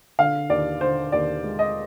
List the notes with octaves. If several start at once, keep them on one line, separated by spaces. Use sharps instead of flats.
D3 F5
D#2 D5
D3 C5
D#2 D5
G#3
D#5